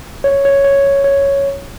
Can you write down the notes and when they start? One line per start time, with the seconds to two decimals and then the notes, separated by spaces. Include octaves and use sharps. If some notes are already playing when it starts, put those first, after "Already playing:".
0.24 C#5
0.45 C#5
0.64 C#5
1.04 C#5